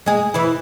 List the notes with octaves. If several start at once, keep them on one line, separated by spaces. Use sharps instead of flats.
G#3 G#4
E3 E4